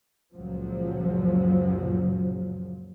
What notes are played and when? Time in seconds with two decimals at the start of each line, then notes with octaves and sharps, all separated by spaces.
0.33 C#2 F#2 A#2 C#3 F3 F#3